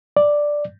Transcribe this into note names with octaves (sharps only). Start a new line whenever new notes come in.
D5